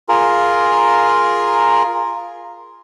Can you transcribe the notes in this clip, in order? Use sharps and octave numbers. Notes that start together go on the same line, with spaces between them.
F4 G#4 A#4